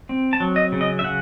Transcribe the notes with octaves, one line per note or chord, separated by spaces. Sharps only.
C4
A5
F#3
D#5
C#3
D#5
E5
C#3 F#5